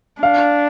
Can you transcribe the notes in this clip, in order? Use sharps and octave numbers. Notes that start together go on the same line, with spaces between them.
D4 F5